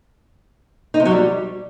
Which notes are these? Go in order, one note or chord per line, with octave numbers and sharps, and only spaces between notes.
D#4
C3
F#3
G3